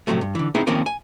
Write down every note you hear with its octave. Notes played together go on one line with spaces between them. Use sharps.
A2 C3 F3 F#3 A3
G2
D3 E3
B3 C4 D#4 E4 G#4 B4
D#3 F3 A#3 C4 C#4 A#4
G#5